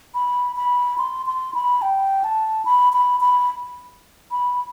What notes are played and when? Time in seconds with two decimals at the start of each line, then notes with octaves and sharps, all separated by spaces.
0.14 B5
0.56 B5
0.98 C6
1.26 C6
1.54 B5
1.82 G5
2.24 A5
2.65 B5
2.93 B5
3.21 B5
4.31 B5